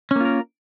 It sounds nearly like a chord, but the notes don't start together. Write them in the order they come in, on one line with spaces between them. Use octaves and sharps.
C#4 A#3 F4 A#4